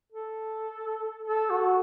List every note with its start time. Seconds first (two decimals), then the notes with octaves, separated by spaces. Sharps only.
0.12 A4
1.27 A4
1.50 F#4